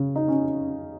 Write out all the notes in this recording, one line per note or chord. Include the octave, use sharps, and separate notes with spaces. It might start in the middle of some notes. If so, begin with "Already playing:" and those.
Already playing: C#3
D#4
C#4